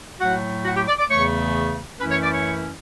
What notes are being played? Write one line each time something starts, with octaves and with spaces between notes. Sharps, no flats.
A2 F#3 A3 F#4 F#5
F#4 F#5
G4 G5
D5 D6
D5 D6
E2 C#3 E3 A3 C#5 C#6
F#2 E3 A3 C#4 E4 B4 B5
C#5 C#6
D5 D6
C#5 C#6